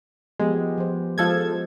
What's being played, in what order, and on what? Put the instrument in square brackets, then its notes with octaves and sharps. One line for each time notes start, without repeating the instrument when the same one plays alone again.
[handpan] F3 B3 G4 [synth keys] G#3
[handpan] F3 C5
[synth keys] F3 A4 G#6 [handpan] G#3